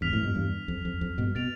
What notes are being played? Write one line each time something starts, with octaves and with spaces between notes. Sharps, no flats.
E2 G2 F6 B6 F7
F2 A2
G2 B2
E2 G2
F2
F2
F2
G2 B2
B2 A6 D7 F7